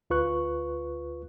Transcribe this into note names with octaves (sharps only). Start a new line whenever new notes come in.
D2 F4 B4 C#6 F#6